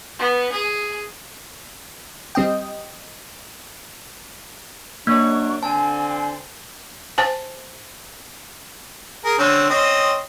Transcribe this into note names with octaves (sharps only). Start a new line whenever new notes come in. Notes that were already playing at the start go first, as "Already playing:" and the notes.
B3
G#4
G3 C4 D#5 G5
F#2 A#3 C#4 D4 C#6
D3 C4 G#5 A5
C5 G#5 A5
G#4 A#4
D3 C4 C#4
C4 C#4 D#5